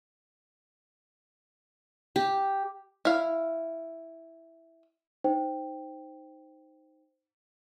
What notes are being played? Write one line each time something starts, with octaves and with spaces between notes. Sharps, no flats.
G4
E4 F5
D#4 C5 G5